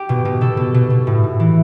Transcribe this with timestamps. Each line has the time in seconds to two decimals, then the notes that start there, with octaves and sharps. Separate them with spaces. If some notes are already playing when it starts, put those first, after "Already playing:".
Already playing: G4
0.09 B2
0.25 B2
0.41 B2 A4
0.57 B2
0.74 B2
0.90 B2
1.07 A2
1.24 A2
1.40 E3